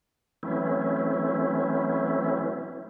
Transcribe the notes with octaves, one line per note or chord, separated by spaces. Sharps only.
E3 F#3 A3 C4 C#4 E4